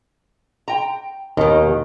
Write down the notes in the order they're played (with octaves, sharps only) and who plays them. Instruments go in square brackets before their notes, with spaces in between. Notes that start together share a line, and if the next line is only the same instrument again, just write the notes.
[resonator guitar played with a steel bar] G5 A#5
[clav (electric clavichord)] D#2 [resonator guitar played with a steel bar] B2 D#3